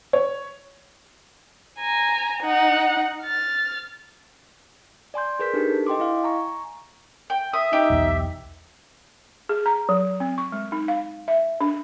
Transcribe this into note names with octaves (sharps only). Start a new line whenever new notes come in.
C#5
G#5 A#5
D#4 F#5
F6 A6
D5 G#5 C6 G6
G#4 A#4 B4 G6 B6
D4 D#4 G4 A4
D#5 G5 C6 D6
E4 D#5 F5
G#5 A#5 C#6
G5
E5 D#6
D#4 G4
B1 E2 B3
G#4
A#5
F#3
C4
C#6
G#3
D#4
F5
E5
D4